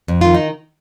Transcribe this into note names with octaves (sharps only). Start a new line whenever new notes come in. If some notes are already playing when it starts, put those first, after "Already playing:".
F2
D#3 F4
D#4